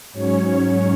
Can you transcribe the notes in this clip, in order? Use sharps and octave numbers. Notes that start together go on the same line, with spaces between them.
G#2 F#3 C#4 C#5